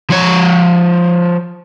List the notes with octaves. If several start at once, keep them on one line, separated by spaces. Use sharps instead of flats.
F3 C#5